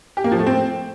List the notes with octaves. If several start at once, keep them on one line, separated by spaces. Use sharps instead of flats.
G4
A#3
F3
A3
C4